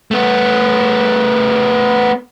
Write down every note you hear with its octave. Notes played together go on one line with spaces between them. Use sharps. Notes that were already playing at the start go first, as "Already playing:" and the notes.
A3 B3